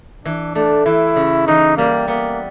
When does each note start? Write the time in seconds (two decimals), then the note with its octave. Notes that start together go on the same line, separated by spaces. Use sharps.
0.25 E3 D4
0.55 A3 D4
0.86 E3 E4
1.16 C#3
1.47 E3 D#4
1.77 G3 A#3
2.08 A#3 B3